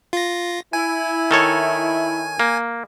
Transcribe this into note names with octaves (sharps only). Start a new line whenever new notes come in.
F4 A#6
E4 G#5
D#3 A4 C#5
A#3